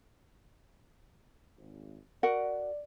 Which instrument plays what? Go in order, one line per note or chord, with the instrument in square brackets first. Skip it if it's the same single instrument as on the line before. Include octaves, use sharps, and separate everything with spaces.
[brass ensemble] G#1
[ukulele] F#4 A#4 F#5 [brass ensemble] D5